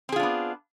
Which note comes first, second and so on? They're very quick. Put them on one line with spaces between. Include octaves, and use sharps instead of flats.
C4 G#4 F4 D4 B3